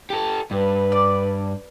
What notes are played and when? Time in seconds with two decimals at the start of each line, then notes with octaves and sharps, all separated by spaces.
0.10 G4 A4
0.51 G2 B4
0.92 D5